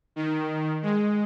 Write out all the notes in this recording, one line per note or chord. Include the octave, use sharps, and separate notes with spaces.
D#3
G#3